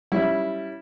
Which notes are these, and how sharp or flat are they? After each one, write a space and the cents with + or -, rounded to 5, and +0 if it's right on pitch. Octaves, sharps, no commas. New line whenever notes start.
G3 +0 C#4 +0 E4 +0